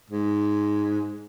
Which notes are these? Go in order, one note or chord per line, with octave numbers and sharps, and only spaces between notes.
G#2